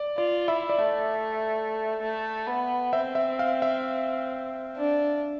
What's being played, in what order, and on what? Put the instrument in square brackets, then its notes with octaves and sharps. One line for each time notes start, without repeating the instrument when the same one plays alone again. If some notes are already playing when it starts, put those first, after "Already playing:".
Already playing: [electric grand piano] D5
[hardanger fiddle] F4 [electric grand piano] D5
[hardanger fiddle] E4 [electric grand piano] E5
[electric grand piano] D5
[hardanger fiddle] A3 [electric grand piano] E5
[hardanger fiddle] A3
B3
[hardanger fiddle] C4 [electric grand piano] E5
[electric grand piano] E5
F5
E5
[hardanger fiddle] D4